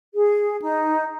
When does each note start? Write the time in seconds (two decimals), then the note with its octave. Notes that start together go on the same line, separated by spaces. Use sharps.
0.14 G#4
0.61 D#4